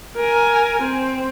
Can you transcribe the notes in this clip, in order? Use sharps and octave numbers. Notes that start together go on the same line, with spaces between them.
A#4 G#5
C4